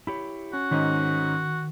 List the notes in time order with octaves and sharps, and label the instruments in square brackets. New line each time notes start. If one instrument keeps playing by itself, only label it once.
[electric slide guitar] E4 G4 C#5 [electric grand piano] B5
[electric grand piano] C#4 [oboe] F#4
[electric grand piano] G#2 C#4 D#4 [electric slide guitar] D#3